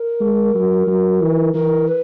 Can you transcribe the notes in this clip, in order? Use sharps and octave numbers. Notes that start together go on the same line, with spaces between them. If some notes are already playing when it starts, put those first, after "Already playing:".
Already playing: A#4
G#3
F#3
F#3
E3
E3 A#4
B4